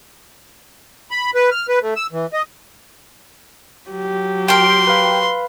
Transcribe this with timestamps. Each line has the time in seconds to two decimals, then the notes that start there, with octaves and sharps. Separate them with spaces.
1.11 B5
1.35 B4
1.51 F6
1.68 B4
1.82 A3
1.96 E6
2.12 E3
2.33 D#5
3.89 F#3 G4
4.48 A#4 G5 C6
4.87 B4 F5 B5